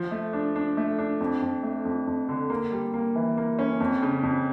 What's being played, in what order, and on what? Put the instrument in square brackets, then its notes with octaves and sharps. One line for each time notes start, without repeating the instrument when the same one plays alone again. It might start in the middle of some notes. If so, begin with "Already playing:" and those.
Already playing: [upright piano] F3
A3
D4
D4
A3
D4
F2
F2
A3
F2
F2
D3
A#3
G3
A#3
E3
A#3
C#4
F2
C#3
F2